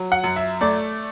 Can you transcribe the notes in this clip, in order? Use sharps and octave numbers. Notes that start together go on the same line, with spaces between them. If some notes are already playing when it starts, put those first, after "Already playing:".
Already playing: F#3
F#5
F#2
E5
A3 D5